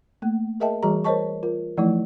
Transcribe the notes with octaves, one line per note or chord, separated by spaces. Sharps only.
A3 A#3
G#4 A#4 D#5 E5 G5 A5
E3 G3 F#4 G#4 A#5
A#4 C5 C#5 D#5 A5 C#6
F4 A#4
E3 F3 A3 D#4 E4